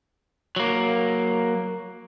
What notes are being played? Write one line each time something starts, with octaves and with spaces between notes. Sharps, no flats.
F#3 A#3